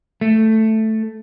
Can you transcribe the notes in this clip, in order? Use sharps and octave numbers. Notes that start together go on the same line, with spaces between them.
A3